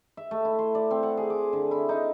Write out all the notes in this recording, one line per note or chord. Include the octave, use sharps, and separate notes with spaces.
E5
A3
E4
C6
D5
C4
F#5
G#4
D6
D3
E4
D#4